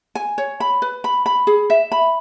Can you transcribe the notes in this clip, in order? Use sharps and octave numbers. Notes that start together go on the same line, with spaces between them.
G#5
C#5
B5
B4
B5
B5
G#4
E5
B5